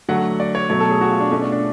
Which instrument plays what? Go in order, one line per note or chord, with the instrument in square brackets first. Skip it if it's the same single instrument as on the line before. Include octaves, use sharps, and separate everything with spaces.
[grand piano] D3 F#3 A3 F#5
D5
C#5
B2 F#3 A3 C#5
A4
G#4
F#4
F4
D4
B2 A3 C#4
D4
D4